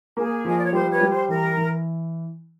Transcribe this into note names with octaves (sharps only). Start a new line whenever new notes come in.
A#3 G#4
F3
D#5
D5
C#5
G3 C5
B4 C#5
G3
C5
E3 A#4
E3